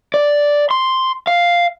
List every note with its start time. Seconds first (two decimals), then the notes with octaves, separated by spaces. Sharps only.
0.14 D5
0.71 C6
1.27 F5